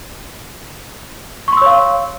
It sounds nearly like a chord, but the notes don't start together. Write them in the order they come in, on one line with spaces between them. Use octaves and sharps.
C#6 C6 E6 C#5 F5